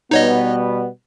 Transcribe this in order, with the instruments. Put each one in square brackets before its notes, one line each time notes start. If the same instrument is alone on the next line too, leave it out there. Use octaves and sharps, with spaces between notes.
[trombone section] B2 G3 B3 [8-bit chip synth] D#4 C#5 D#5